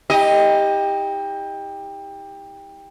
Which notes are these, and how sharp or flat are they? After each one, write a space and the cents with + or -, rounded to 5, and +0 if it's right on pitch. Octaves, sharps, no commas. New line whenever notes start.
E4 -45 G4 +20 D#5 +0